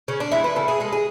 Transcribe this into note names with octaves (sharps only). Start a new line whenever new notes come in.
C#3 C#4
D4
E3 G#3 E4
B4
C#3 A4
G#4
G#3 A4
G#4